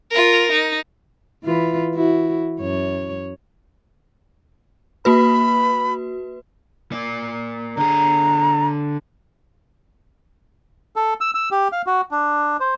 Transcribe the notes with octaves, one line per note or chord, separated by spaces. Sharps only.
F4 A#4
D#4
E3 F4 B4
E4 F#4
F#2 C#5
A#3 F#4 B4 B5
A#3 D5
D3 G#4 A#5
A4
E6
E6
G4
F5
F#4
D4
C5